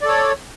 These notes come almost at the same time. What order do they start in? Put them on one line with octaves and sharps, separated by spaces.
D5 A4 C#5